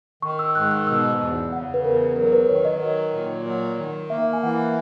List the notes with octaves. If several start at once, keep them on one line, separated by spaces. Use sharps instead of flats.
D#3 C#6
E6
G#2 F#6
F#6
B2 E6
E2
C#3 F#5
B4
E2 A#4
F#3 A#4
A#4
B4
D#3 C#5
D#5
F#3
A#2
F#3
D#3
A#3 E5
G#5
E3 F#5